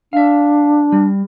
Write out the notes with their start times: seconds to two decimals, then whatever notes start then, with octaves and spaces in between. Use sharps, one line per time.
0.13 D4 E5 F5
0.92 G3